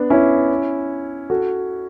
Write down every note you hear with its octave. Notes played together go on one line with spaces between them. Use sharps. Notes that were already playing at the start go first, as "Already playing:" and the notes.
Already playing: B3 D4
C#4 E4
F#4 A4